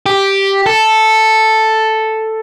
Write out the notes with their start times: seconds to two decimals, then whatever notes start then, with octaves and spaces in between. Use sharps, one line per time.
0.06 G4
0.66 A4